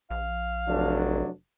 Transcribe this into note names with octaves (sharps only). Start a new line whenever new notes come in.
A#1 F5
F1 F#3 D4